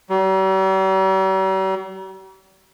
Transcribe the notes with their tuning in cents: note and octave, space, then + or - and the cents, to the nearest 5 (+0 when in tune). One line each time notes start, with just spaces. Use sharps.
G3 -45